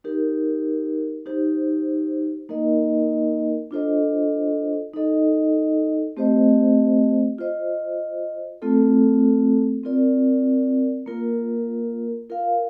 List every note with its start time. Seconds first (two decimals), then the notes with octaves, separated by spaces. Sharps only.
0.04 D#4 G4 A#4
1.26 D#4 G4 C5
2.49 A#3 D#4 A#4 D#5
3.71 D4 F4 A4 C5 D#5
4.93 D#4 A4 D#5
6.17 A3 C4 G4 C5 D#5
7.38 F4 C5 D#5
8.62 A3 C4 F4 A4
9.83 C4 F4 A#4 D5
11.06 A#3 F4 A#4
12.30 F4 A#4 F5